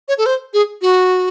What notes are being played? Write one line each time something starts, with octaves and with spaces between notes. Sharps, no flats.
C#5
A4
C5
G#4
F#4